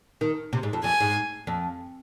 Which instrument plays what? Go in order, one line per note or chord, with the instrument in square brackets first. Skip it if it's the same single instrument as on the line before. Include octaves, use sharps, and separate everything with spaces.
[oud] D#3
C3
G#2
F2
[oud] F2 [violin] G#5
[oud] G#2
F2